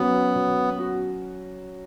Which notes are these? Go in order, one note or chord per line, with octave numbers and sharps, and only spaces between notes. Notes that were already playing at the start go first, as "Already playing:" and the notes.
Already playing: F#3 B3 C#4
F#3
F#4